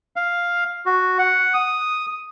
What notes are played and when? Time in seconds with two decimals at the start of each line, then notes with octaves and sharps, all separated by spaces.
0.16 F5
0.86 F#4
1.18 F#5
1.54 D#6